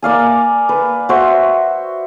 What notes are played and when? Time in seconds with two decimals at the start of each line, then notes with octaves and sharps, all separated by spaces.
0.02 A#3 D5 F5 G#5
0.69 B4
1.09 F#4 C5 E5